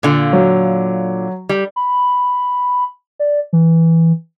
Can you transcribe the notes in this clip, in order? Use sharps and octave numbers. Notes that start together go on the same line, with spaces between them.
A#2 D3 F4
F#3
G3
B5
D5
E3